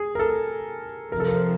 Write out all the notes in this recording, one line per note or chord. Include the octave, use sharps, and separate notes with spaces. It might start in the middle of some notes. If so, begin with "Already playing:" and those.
Already playing: G#4
A#4
A4
F2 C3 F3 A#4
A4
A#4